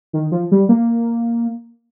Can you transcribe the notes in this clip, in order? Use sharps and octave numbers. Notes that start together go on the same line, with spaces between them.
D#3
F3
G3
A#3